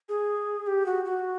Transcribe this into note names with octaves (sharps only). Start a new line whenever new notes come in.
G#4
G4
F#4
F#4